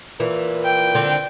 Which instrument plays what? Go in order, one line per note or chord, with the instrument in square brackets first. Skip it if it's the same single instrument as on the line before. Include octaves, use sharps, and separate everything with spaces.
[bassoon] A#2 [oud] E3
[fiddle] G5
[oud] D3 C4